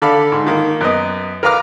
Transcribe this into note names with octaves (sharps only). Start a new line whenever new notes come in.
D3 A4 D5 F5 B5
G#2
D#3 A#3
F#2 B3 D#5
A#4 B4 F5 A#5 D6 F6